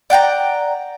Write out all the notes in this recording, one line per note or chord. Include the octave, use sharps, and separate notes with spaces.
D5 F#5 G5 A#5